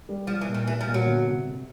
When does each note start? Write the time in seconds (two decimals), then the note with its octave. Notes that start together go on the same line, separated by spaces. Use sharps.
0.09 G3
0.27 F3 G3
0.41 E3
0.48 A#2
0.54 D#3
0.67 E3 G3
0.81 F3
0.88 A#2
0.94 F#3
1.06 G1
1.27 C3
1.46 C3